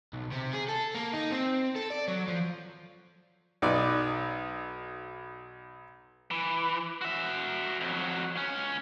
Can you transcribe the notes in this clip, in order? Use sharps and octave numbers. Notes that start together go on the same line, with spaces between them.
B1
C3
G#4
A4
A#3
D#4
C4
A4
D5
F#3
F3
B1 D#4 B4 D5
E3
F#4 E5
F2 F#3
C#2 C#4